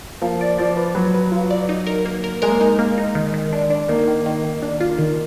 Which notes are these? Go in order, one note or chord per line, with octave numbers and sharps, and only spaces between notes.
F3 A#3
D5
F3 D5
B4
F#3 B4
B4
F4
D5
D#4
A#4
A#3
A#4
G#3 A#4
A#3
G#3 D#4
A#3
D#4
D#3
D#3
D4
D4
D#3 A#3
D#3
D#3
D#3
D4
F4
D#3